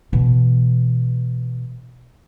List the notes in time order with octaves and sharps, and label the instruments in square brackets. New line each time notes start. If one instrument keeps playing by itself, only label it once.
[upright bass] B2 E3